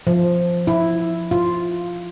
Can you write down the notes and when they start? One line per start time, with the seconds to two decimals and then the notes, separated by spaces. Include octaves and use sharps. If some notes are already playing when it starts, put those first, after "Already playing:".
0.07 F3
0.67 E4
1.31 F4